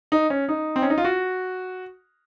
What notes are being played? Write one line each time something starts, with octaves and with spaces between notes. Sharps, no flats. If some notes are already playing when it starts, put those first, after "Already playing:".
D#4
C#4
D#4
C4
C#4
D#4
F4
F#4